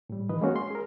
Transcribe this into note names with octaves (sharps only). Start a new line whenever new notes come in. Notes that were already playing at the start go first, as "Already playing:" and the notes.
A2 G3
D#3 E3 B4 D#5
G#3 A#3 C#4 F#4
C6
G#4 A#4